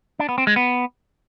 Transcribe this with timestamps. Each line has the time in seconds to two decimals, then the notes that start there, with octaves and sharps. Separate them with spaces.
0.19 D4
0.29 B3
0.38 C4
0.47 G#3
0.56 B3